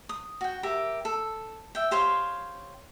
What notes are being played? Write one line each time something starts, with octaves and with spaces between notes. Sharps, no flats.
D#6
F#4 G5
G4 A#4 E5
A4
E5 G5
G4 C5 C#5 F5